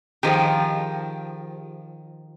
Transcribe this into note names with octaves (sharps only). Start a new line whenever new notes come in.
D#3 F3 G4 G#4